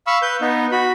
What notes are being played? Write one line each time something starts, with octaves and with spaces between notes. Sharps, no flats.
F5 B5 C#6 E6
B4 G6
B3 D#4
F#4 B5